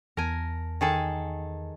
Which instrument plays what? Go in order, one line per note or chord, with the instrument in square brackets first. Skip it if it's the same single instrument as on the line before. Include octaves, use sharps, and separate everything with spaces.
[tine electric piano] E2 A5 [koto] A#4 G#5
[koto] D#3 G#4 A4